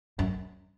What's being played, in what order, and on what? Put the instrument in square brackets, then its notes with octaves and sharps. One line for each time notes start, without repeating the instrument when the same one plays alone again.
[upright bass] F#2